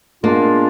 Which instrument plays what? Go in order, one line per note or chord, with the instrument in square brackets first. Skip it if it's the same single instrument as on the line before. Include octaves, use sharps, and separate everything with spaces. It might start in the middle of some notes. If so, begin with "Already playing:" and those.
[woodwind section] A#2 G#3 B3 D4 F4 [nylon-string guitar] A#3